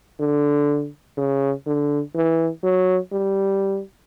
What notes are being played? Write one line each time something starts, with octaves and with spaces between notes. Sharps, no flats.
D3
C#3
D3
E3
F#3
G3